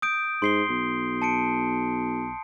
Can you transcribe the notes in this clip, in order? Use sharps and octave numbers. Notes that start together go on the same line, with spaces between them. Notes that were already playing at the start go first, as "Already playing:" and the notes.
D#6 G6 D7
G#2 C6 C7 G7
B1
A5 C#7 D7